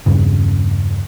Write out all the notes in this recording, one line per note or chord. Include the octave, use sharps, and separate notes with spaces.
E2 G2 C#3